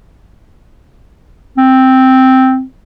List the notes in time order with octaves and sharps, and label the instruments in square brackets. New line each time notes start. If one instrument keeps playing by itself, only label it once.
[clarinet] C4